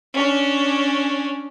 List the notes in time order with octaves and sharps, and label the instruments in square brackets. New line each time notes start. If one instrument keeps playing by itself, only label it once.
[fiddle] C#4 D4